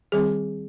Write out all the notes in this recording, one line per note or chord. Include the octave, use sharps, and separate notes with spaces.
D#3 G3 C4 G#4